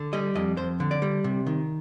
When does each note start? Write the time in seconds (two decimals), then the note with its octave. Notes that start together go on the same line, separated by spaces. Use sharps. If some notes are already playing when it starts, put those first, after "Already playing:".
Already playing: D3
0.13 G3 D#5
0.35 F2 D#5
0.57 F2 C5
0.80 D3
0.91 D5
1.02 G3
1.24 C3
1.46 D#3